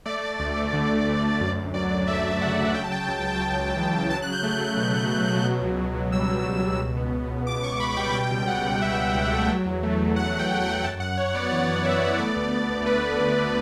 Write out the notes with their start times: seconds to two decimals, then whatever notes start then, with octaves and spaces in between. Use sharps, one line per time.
0.05 A3 D5
0.23 A3
0.40 D2
0.56 A3
0.73 D3
0.90 D3
1.06 D2
1.24 D2
1.40 F#2 D5
1.57 F#2
1.74 F#3 D5
1.91 F#3
2.07 A3 E5
2.25 F#3
2.41 C#3 F#5
2.58 F#3
2.75 C#3 G5
2.84 A5
2.92 C#3 G5
3.00 A5
3.08 C#2 G5
3.18 A5
3.25 C#2 G5
3.36 A5
3.42 C#3 G5
3.59 C#2
3.76 E3
3.93 C#3
4.10 F#3 A5
4.22 F#3 F#6
4.32 G6
4.43 A3
4.55 F#6
4.60 F#3
4.77 B2
4.94 A3
5.11 F#3
5.28 F#3
5.44 B2
5.61 C#2
5.78 B2
5.95 B2
6.12 G3 E6
6.29 C#2
6.46 B2
6.62 B2
6.79 C#2
6.97 B3
7.13 C#2
7.30 C#2
7.47 B2 D6
7.63 C#2 C#6
7.80 C#2 B5
7.97 G3 G5
8.14 B2 G5
8.31 C#2
8.47 C#2 F#5
8.64 C#2
8.81 B2 E5
8.99 C#2
9.15 C#2
9.31 A3
9.49 F#3
9.65 E2
9.83 A3
9.99 E2
10.16 A3 F#5
10.33 F#3
10.39 G5
10.50 E2
10.61 F#5
10.67 A3
10.83 F#2 A5
11.00 F#2 F#5
11.17 F#2 C#5
11.35 B3 D5
11.50 E3 F#5
11.68 F#2
11.84 E3 E5
12.01 B3
12.18 A3 D5
12.36 D2
12.52 D2
12.69 D2
12.86 A3 B4
13.03 D2
13.20 D3
13.36 D2